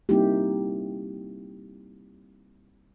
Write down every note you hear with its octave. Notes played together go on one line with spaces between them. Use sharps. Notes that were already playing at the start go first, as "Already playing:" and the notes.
G3 A#3 C4 D#4 E4 G4